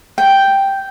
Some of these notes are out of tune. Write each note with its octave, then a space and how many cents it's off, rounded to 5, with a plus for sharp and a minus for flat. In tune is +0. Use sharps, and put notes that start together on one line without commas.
G5 +0